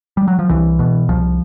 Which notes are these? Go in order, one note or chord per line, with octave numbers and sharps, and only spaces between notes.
G3
F#3
F3
C2 E3
B2
C2 F3